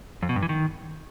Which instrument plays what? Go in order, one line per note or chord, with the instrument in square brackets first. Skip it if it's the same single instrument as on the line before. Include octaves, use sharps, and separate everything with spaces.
[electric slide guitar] F2
B2
G2
E3
D#3